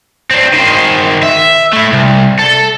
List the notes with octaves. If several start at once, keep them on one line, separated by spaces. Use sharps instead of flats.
C4 D4
D#3 C5
E5
A3 E4
C2
A4